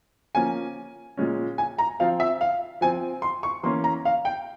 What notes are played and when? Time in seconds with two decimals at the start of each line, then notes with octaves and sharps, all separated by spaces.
0.35 F3 A#3 C#4 G#5
1.17 A#2 G#3 C#4
1.58 G#5
1.78 A#5
2.00 F3 C4 F5
2.20 E5
2.41 F5
2.81 F3 C4 G#5
3.22 C6
3.43 C#6
3.63 E3 A#3 C#4 C6
3.84 A#5
4.05 F5
4.25 G5